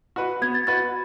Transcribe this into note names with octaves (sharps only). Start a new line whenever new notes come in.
F#4 B4
B3 G#6
A6
F#4 B4 A6